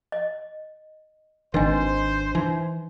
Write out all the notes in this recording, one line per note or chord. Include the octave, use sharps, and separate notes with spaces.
D#5
G#1 D#3 D4 B4 C5 D#5 G#5
E3 D#4